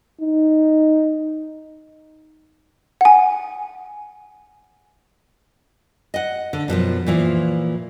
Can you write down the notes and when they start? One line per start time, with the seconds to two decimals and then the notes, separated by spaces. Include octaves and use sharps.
0.21 D#4
3.01 F#5 G#5
6.14 D#5 F#5
6.53 D3
6.68 F#2 B2 D#3 F3
7.06 A#2 E3 F3